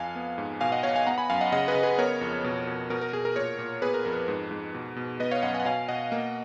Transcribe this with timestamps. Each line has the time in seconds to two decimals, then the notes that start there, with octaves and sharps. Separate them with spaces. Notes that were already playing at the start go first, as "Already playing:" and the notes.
Already playing: F2 F5 G#5
0.15 B3
0.38 G#2
0.61 B2 F5 G#5
0.72 D#5 F#5
0.83 B2 C#5 F5
0.96 F5 G#5
1.07 B3 F#5 A#5
1.18 G#5 B5
1.30 F#2 F5 G#5
1.41 D#5 F#5
1.52 C#3 D#5 F#5
1.68 G#4 B4
1.75 C#3
1.83 G#4 B4
1.98 B3 A#4 C#5
2.21 F2
2.44 B2
2.67 B2
2.90 B2 A#4
3.01 A#4
3.13 B2 G#4
3.25 A#4
3.36 A#2 A#4 C#5
3.59 A#2
3.82 B3 G#4 B4
3.94 A#4
4.05 F2 A#4
4.28 G#2
4.51 G#2
4.74 B2
4.96 B2
5.20 B3 B4 D#5
5.31 C#5 F5
5.43 F#2 D#5 F#5
5.54 F5 G#5
5.60 F#5
5.65 B2 F5 G#5
5.88 B2 D#5 F#5
6.12 A#3